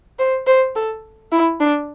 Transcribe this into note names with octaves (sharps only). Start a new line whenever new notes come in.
C5
C5
A4
E4
D4